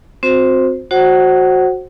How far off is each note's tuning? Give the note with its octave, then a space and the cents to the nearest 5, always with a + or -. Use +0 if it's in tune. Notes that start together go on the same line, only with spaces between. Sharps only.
C4 +0 F#4 -35 C5 +0
F#4 -5 C5 +25 F#5 +20